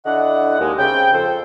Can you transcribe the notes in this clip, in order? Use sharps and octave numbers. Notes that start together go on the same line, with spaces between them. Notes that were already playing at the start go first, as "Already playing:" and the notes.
D3 D4 E4 D#5 F#5
D#2 G#3
C#3 C4 G5
F2 A4 C5